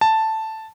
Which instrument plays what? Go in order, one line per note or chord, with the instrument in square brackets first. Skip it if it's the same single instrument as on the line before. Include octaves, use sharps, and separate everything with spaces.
[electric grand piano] A5